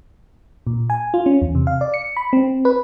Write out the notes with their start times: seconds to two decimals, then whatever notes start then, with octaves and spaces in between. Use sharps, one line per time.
0.67 A#2
0.90 G#5
1.14 F4
1.26 C#4
1.42 E2
1.55 C3
1.67 F5
1.81 D5
1.94 C#7
2.17 B5
2.33 C4
2.65 B4